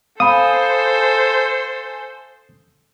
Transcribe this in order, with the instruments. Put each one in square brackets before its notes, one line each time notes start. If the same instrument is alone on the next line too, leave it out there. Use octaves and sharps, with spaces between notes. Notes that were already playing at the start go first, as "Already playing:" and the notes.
[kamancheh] A4 C5 [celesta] F5 B5 [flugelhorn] G#5 [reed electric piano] D#6